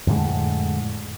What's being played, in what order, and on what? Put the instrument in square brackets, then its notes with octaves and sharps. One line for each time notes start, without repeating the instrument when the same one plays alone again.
[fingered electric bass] F2 A2 D3 G#3